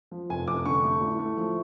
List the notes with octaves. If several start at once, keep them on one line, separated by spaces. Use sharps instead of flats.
F3
F1 G#5
F1 D6
D3 C#6
A3
A2
A3
F3